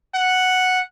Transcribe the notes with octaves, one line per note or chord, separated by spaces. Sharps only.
F#5